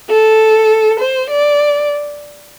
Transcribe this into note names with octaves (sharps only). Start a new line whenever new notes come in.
A4
C5
D5